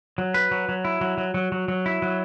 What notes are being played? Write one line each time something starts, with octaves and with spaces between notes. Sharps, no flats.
F#3
B4
F#3
F#3
E4
F#3
F#3
F#3
F#3
F#3
E4
F#3